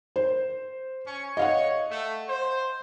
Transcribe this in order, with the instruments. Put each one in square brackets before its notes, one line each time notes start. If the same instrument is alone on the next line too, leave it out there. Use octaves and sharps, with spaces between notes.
[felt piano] C5
[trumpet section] C#4 G#5 C#6
[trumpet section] C#5 [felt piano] D#5 F5 F#5
[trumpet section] A3
C5